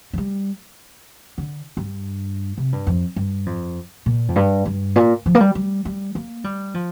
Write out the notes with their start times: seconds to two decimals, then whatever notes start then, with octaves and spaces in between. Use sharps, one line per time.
0.13 F3
0.18 G3
1.38 D3
1.77 G2
2.58 C3
2.72 G2
2.87 F2
3.16 G2
3.46 F2
4.06 A#2
4.28 F2
4.36 G2
4.66 G2
4.96 A#2
5.26 F3
5.35 A#3
5.40 G3
5.55 G3
5.85 G3
6.15 A#3
6.44 G3
6.74 F3